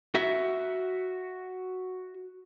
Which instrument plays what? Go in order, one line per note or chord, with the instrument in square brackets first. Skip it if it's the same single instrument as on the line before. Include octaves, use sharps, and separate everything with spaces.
[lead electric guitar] F#4 E5